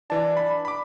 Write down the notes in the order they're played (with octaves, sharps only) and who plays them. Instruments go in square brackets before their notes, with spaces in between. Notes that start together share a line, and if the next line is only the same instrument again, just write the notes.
[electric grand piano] E3 A5 [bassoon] D4
[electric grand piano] B5
B5 D6